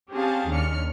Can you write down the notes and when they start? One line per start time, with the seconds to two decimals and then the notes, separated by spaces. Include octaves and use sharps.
0.12 C4 C#4 G4 G#4 F5 A5
0.50 D#2 C#4 D4 F6 C#7